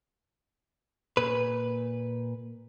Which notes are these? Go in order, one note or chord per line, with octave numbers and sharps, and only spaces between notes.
A#2 B4